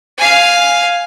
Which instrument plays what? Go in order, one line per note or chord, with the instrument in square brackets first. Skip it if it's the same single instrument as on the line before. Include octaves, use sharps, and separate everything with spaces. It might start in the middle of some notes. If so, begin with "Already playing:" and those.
[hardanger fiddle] F5 G#5